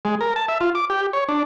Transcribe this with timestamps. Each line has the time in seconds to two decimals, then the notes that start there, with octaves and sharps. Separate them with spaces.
0.05 G#3
0.21 A#4
0.36 A5
0.48 E5
0.61 F4
0.75 D6
0.90 G4
1.13 C#5
1.29 D4